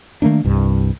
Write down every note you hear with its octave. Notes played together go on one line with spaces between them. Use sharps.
D#3 A3 A#3 D4
C2 G2